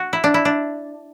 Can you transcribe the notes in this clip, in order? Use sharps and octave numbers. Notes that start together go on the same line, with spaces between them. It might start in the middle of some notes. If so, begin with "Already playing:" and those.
Already playing: F#4
E4
D4
E4
D4